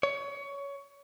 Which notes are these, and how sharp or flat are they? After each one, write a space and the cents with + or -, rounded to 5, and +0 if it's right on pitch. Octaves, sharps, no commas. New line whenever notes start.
C#5 +20